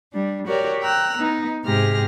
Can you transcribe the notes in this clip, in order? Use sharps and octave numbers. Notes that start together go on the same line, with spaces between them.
G3 D4
F#4 G4 A#4 C#5 D5
G5 A#5 E6 F#6
B3 D#4
G#2 C3 G4 G#4 F6 A#6